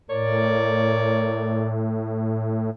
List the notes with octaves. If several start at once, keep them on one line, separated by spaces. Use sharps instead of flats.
A2 A#4 C#5 D5